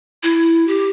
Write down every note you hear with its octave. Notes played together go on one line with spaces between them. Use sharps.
E4
G4